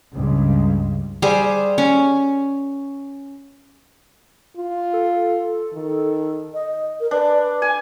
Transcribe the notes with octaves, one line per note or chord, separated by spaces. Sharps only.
C#2 G2
G3 G#4 C5
C#4
F4
A4
D#3
D#5
A#4
D4 B4
G#5